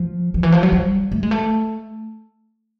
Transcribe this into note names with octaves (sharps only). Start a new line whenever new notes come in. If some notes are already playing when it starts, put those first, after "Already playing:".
Already playing: F3
D#3
E3
F3
F#3
G3
A3
G#3
A3